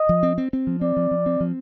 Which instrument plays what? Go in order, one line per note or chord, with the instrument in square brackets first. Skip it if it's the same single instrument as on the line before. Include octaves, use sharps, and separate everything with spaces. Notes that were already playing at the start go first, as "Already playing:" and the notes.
Already playing: [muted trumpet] D#5
[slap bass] F3
C4
C4
C4
F3
[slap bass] C4 [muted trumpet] D5
[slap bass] F3
F3
C4
F3